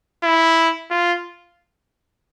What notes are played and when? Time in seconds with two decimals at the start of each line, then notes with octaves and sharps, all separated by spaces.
0.23 E4
0.90 F4